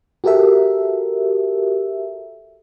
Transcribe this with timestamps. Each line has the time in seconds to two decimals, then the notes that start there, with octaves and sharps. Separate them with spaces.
0.24 F#4 G4 A4 A#4 E5